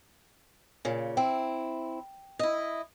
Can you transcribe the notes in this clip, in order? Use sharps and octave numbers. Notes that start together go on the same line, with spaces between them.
A#2 C#3
C4 E4 G5
E4 D#5